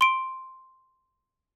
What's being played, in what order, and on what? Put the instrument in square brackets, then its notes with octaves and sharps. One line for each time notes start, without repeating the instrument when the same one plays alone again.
[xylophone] C6 D7